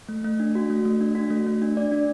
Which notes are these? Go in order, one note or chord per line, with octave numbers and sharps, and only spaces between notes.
A3
A3
D4
F#4
A3
A3
D4
F#4
A3
A3
D4
D5
D4